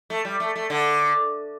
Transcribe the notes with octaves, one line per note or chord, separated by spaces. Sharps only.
A3
G3
A3
A3
D3